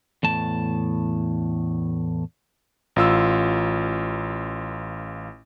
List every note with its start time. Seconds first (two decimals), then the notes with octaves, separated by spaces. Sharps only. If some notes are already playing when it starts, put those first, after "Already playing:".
0.23 E2 A2 A5
2.96 A1 F4 E6